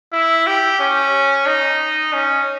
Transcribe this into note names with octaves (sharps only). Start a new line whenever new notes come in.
E4
G4
C#4
D#4
C#4